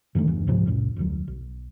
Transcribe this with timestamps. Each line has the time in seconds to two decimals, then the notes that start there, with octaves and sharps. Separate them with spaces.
0.15 F#2 D3 D#3 A3
0.27 G1 E2 G2 E3
0.47 C#2 G#2 C3 F3
0.66 C#2 F#2 A#2
0.96 F1 D2 F#3
1.28 B1